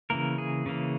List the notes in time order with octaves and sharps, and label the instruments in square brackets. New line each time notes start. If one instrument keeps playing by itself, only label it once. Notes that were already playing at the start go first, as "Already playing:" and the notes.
[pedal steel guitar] C#3 E3 A#3 A#4
G#4
C#3 E3 A#3